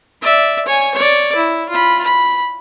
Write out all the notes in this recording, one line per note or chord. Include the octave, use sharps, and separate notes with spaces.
D5 E5
C#5 G#5
C#5 D5
E4
F4 B5
B5